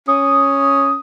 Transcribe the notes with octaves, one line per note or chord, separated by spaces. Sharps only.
C#4 D#6